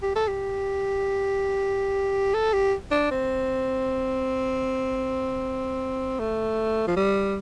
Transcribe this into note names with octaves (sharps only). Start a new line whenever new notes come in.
G4
A4
G4
A4
G4
D4
C4
A3
F3
G3